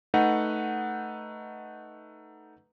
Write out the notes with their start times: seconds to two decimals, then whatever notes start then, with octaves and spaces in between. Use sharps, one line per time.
0.14 A3 D#4 B4 F#5